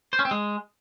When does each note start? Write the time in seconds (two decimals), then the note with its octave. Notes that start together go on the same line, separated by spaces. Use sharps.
0.13 C5
0.19 C#4
0.25 C4
0.31 G#3